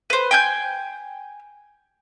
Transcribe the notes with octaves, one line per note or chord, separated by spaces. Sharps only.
B4 C5
G5 G#5 G6